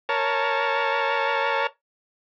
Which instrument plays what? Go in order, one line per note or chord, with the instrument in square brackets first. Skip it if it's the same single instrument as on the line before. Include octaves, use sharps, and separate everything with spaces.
[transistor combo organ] A#4 C#5 A5